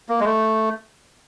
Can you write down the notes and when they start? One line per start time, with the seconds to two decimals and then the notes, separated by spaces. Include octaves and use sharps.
0.09 A#3
0.20 G#3
0.25 A3